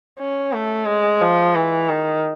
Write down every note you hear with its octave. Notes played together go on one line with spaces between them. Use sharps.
C#4
A3
G#3
F3
E3
D#3